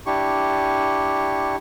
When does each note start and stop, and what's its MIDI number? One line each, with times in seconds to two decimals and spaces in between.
0.06 1.56 62
0.06 1.56 64
0.06 1.56 67
0.06 1.56 85